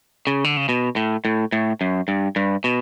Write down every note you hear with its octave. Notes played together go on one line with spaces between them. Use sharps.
C#3
D3
C#3
B2
A2
A2
A2
F#2
G2
G2
B2